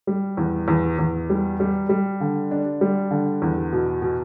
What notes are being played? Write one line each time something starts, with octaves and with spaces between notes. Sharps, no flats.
G3
E2
E2
E2
G3
G3
G3
D3
D4
G3
D3
E2
B2
B2